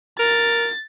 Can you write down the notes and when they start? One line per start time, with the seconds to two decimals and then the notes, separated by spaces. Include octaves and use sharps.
0.19 A#4 A6